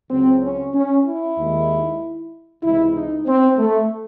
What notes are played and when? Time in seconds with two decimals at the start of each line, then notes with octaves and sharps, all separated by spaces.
0.10 C#2 C#3 F#3 C4
0.42 C#4
0.73 C#4
1.06 E4
1.37 D#2 D#3 G#3
2.62 C#2 C3 E3 G#3 E4
2.94 D#4
3.26 C4
3.58 A3